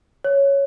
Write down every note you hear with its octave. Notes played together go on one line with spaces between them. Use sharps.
C#5